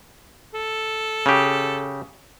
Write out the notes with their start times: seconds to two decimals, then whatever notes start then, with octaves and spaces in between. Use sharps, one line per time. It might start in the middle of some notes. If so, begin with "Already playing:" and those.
0.54 A4
1.26 C#3 G4